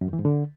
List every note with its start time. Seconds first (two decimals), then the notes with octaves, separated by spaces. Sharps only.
0.01 F#2
0.07 E2
0.13 E3
0.19 G#2
0.25 D3